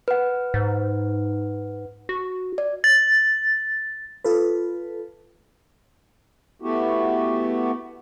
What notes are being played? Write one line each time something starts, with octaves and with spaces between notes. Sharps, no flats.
B4 F#5
G#2
F#4
D5
A6
F4 A4 B4
A3 B3 E4 F#4 G4